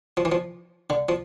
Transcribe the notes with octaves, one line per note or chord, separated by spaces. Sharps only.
F3
E3
F3
D3
F3